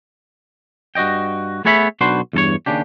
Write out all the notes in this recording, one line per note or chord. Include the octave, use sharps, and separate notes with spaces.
G2 F#4 D5 D#5 G5
A3 B3 G#4 C#5 E5 B5
B1 D4 F#4 B4 C5 C6
E2 G2 A4 C#5
D#2 C#3 D4 G4